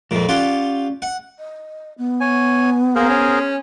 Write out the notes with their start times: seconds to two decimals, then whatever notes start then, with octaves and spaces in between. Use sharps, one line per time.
0.11 F2 A#2 F3 G#3
0.29 C#4 F4 G4 D5 F#5
1.02 F#5
1.39 D#5
1.98 B3
2.20 C#5 G#5
2.95 A#3 G#4 A#4 C5
3.09 C#4